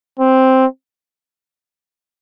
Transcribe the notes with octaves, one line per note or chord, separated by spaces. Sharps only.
C4